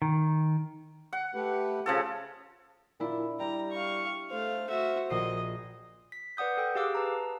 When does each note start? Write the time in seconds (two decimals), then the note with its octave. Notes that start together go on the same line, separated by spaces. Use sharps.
0.02 D#3
1.13 F#5
1.35 A3 G4 B4
1.86 C#3 F3 A4
3.00 A#2 D4 E4
3.40 G3 G4 A#5
3.72 F5 C#6
4.31 A3 C5 F5
4.70 F#4 E5
5.10 A#1 D#5 C7
6.12 B6
6.37 B4 D5 F#5 D#6 G6
6.57 A4 G5 D#6
6.75 G4 G#4 F5 D6 E6 F#6
6.95 B4 A5 A#5